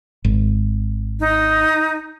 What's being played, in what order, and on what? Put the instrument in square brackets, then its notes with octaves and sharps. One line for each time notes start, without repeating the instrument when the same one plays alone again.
[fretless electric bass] G#1
[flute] D#4